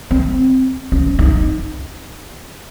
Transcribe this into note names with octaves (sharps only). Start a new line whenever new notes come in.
C4
C#4
D#4